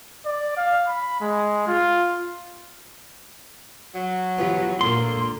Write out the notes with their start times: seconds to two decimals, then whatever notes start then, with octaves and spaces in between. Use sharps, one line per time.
0.25 D5
0.57 F5
0.87 B5
1.21 G#3
1.68 F4
3.96 F#3
4.38 E3 B3 F4 G4
4.81 A#2 D3 A#3 C6